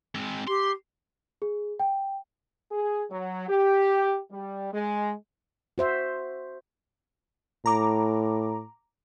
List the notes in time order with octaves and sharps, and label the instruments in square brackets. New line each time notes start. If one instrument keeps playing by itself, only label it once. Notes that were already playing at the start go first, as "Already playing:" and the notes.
[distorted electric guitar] G#3 C4
[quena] G4 [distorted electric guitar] C6
[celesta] G#4
G5
[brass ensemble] G#4
F#3
G4
G3
G#3
[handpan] F#4 C5 E5
[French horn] A2 [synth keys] A#5 D6